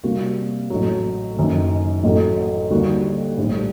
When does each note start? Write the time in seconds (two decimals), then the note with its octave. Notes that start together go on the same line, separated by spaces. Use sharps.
0.04 C3 G3 A#3 F#4
0.70 A1 A2 F#3
1.37 F#1 F#2 D#3
2.04 A1 A2 F#3 A3
2.70 D#2 D3 G3 A#3 F#4
3.38 A#1 A2 G3